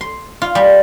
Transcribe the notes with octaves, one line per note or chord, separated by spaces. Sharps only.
C6
F4
G3